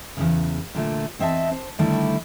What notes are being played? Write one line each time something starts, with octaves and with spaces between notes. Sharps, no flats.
E2 G2 C#3
A#2 D3 A3
E2 C4 D#5 E5 A5
C5
D3 D#3 G3 A3 E4